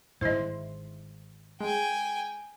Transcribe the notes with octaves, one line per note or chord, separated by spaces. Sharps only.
G1 G#2 D#3 E4 C5 D#5 C6
G#3 G5 G#5